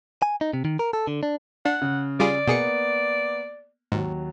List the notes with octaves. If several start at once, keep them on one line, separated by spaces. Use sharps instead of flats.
G#5
D#4
C3
D#3
A#4
A4
D3
D4
D4 F#5
C#3
G3 F4 G#4 D5
B2 A#3 B3 G#4 C#7
D#2 G#2 F#3